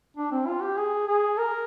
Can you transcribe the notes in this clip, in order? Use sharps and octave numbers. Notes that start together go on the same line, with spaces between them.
D4
C4
F4
G4
G#4
G#4
A#4